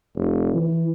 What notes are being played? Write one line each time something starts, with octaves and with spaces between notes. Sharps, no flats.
F1
E3